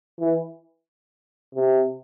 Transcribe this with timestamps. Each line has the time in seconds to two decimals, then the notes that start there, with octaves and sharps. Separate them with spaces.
0.20 E3
1.55 C3